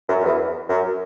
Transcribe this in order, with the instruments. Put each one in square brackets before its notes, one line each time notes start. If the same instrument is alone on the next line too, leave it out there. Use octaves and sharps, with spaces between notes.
[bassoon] F#2
F#2
E2
F#2